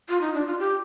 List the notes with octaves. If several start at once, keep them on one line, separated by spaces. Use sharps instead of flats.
F4
D#4
D4
F4
G4